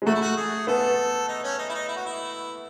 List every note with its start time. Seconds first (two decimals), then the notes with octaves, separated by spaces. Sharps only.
0.02 G#3
0.06 A3 F#4
0.15 E4
0.21 F#4
0.37 G#4
0.67 B3 A4
1.28 D#4
1.44 C#4
1.58 D#4
1.69 E4
1.74 D#4
1.88 E4
1.96 F#4
2.05 E4